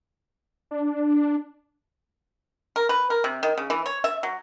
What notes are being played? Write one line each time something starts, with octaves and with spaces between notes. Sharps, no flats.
D4
A#4
B4
A#4
C3
D#3
C#3
E3
C#5
E5
F#3